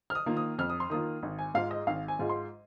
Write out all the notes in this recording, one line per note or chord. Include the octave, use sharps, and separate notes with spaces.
F6
D#6
D#3 A#3 F4
D#6
F2 F6
D#6
C6
D#3 A#3 F4 D#6
G#1
G#5
G#2 G#3 F4 F5
D#5
G#1 F5
G#5
G#2 G#3 F4
C6